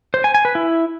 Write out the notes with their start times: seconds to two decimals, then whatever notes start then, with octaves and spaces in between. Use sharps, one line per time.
0.14 C5
0.24 G#5
0.34 G#5
0.45 B4
0.55 E4